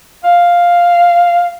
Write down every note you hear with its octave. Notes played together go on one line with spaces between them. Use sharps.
F5